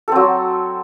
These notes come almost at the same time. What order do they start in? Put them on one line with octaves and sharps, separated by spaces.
A4 C4 F#3